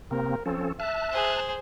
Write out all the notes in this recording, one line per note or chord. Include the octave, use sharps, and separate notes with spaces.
C3 A#3 C4 A#4
F3 C4 C#4 A4
E5 A5 F#6
G#4 C5